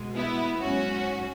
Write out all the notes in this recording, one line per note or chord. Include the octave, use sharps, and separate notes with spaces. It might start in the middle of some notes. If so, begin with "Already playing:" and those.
Already playing: B2 G#3
B3 E4
G#2 F#3 C#4 F#4